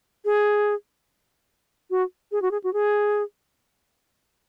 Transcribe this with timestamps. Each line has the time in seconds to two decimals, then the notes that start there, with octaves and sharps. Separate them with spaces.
0.25 G#4
1.90 F#4
2.32 G#4
2.42 F#4
2.51 G#4
2.64 F#4
2.73 G#4